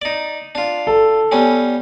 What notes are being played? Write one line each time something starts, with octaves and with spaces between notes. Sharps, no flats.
D#4 D5
D4 F4
A4
G3 B3 C#4